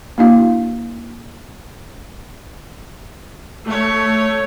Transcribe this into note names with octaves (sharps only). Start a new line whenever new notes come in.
A#3 D4 E4 F#4 F5
A3 C#5